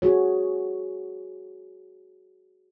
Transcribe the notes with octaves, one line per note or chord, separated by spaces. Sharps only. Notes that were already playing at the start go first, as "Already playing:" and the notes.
F#4 G#4 C#5